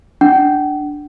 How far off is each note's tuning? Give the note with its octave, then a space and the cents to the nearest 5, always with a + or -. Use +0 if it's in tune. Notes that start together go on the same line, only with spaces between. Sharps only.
D4 +0 F#5 +40